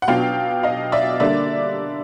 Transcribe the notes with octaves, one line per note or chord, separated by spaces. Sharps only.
F#5
B2 F#3 B3 D4 F4 F5 G5
D#5 F5
D5 E5
D3 G3 A#3 D4 D5 E5